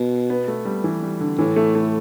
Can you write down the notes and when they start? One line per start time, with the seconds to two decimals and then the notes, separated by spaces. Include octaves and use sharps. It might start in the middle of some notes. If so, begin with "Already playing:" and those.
Already playing: B2
0.30 B3
0.48 A3
0.65 G3
0.84 E3
1.03 G3
1.20 D3
1.39 A2 E3
1.56 A3
1.75 A3